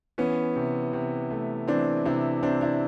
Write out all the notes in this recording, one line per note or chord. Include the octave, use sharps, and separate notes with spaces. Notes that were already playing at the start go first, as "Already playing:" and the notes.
E3 B3 C#4
C3
C3
A3
E3 C4 D4
C3 D4 E4
C3 C4 D4
D4 E4